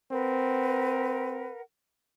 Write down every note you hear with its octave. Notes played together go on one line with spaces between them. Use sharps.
C4 A#4 B4 F#5